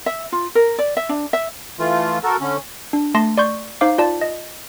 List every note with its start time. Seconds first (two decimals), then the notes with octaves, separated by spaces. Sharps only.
0.06 E5
0.32 F4
0.55 A#4
0.78 D5
0.97 E5
1.09 D4
1.33 E5
1.79 E3 A3 F4
2.23 F#4 A4 A#4
2.40 D3 C#4
2.93 D4
3.14 A3 A5 C6 A#6
3.38 D5 C6 C#6 G6
3.81 D#4 C5 F5 D6
3.98 F4 D5 A5
4.21 D#5